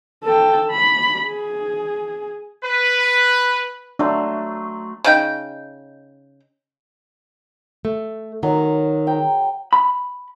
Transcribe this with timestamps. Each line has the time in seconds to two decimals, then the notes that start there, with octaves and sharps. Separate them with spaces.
0.25 A4 G5
0.70 B5
1.26 G#4
2.63 B4
3.99 F#3 A3 D4 C6
5.04 C#3 D#4 G5
7.85 A3
8.43 D#3 F#3
9.07 G5 A#5
9.73 B5